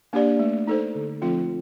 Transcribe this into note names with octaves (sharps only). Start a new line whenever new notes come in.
A#3 D4 G4 D5
A3
D#4 A4 C5
D3
F3 A3 C4 F4